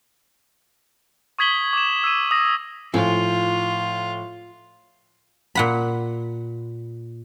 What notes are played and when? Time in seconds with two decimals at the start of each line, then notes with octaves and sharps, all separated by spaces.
1.39 C#6 D#6 G#6 B6 F#7 G7
1.73 D6 E7
2.04 E6 D#7
2.31 D#6 A#6
2.94 A2 F3 F4 G#5
5.55 A#2 F#5 B5